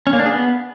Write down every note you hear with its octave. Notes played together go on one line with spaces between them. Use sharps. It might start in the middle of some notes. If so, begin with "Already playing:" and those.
C#4
A#3
D4
G#4
B3